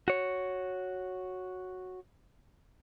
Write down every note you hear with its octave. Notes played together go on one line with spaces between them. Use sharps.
F#4 C#5